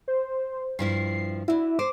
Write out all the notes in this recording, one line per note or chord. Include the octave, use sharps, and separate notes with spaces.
C5
G2 F3 E4 C7
D4 E4 F#4
C5 D6